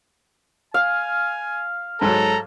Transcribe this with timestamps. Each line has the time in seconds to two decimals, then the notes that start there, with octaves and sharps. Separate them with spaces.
0.74 F5 G#5
2.01 G#2 F#3 A4 A#5